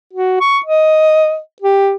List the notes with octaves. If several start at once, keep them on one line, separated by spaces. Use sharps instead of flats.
F#4
C#6
D#5
G4